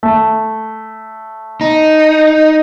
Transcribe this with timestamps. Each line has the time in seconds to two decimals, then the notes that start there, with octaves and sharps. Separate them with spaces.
0.03 A3
1.61 D#4